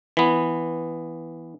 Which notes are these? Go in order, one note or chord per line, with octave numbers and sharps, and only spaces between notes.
E3 B3